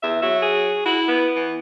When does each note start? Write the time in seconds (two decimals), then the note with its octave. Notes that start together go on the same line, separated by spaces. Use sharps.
0.03 E2 E5
0.22 F#3 E5
0.42 G#4
0.85 E4 F#4
1.08 B3
1.36 E3